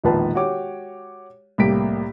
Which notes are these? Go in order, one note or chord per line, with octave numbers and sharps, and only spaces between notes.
E1 A#1 D#3 F4 B4 A5
F#4 G4 C#5 D6
C2 A2 A#3 G4 B6 D7